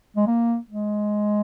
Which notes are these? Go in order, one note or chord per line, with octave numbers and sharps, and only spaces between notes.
G#3
A#3
G#3